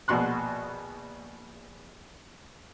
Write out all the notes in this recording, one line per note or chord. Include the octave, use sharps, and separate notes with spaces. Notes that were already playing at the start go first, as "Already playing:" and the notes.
A#1 B2 F#4 C6 F#6